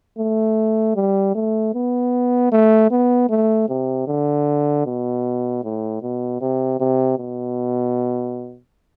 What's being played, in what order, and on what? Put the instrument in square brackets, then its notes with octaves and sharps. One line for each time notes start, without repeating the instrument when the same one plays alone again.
[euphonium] A3
G3
A3
B3
A3
B3
A3
C3
D3
B2
A2
B2
C3
C3
B2